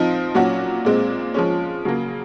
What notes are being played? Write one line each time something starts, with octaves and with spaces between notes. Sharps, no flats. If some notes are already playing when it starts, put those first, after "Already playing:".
Already playing: F3 C4 D#4
A#2 F#3 C#4 F#4
A#2 G#3 C4
F3 G#3 C#4
C#3 F#3 A#3